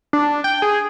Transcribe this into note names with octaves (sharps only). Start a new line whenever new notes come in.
D4
G5
G#4